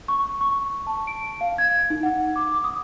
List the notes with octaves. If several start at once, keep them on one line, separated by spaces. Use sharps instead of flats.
C#6
C#6
A5
D7
F5
G#6
D#4
F#5
D6
D#6